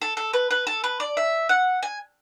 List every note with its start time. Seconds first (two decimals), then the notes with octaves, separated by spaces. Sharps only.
0.02 A4
0.17 A4
0.33 B4
0.51 B4
0.67 A4
0.84 B4
1.00 D5
1.17 E5
1.49 F#5
1.83 G#5